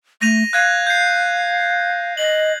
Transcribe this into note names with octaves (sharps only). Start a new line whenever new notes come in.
A3 A#6 D#7 F7
F5 F#6 G#6 D#7
G6 C7
D#5 F#7